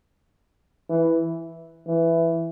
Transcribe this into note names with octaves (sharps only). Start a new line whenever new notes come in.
E3
E3